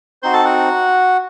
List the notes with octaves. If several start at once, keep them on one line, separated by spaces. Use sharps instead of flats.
C4 D#4 F#4 C5 C6
A4 A5
F#4 F#5